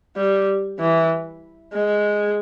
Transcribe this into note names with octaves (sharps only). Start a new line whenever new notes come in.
G3
E3
G#3